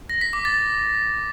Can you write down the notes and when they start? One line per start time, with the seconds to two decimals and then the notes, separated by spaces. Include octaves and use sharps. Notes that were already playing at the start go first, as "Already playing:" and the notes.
0.10 A#6
0.21 B6
0.33 D6
0.45 A6